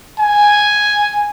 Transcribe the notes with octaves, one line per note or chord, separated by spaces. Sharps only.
G#5